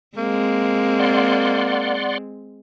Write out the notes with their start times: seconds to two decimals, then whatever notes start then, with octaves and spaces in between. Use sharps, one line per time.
0.17 G#3 A#3 C4
0.99 D5 F#5 C6